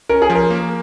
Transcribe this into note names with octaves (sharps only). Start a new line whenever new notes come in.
C#4 A#4
G#4
F3
A#4
A#3